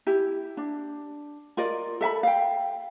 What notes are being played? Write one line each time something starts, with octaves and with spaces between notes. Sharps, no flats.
E4 G4
D4
F4 A#4 D5 D#5
A4 E5 A5 B5
F5 G5